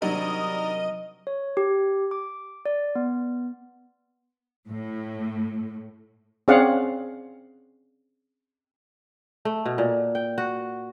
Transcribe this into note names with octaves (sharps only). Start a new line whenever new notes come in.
C3 D#3 F#3 G3 D4 A#4 D#5
C#5
G4
D6
D5
B3
A2
C4 C#4 G#4 D5 F5 F#5
A3
B2
A#2
G5
F#4